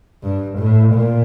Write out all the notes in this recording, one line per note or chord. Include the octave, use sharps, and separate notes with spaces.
G2
A2
A#2